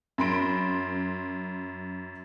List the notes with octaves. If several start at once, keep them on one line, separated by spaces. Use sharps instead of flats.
F#2 B5 C6 D7